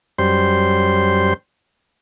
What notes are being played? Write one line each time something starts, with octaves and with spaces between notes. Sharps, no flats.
F#2 G3 C5 C6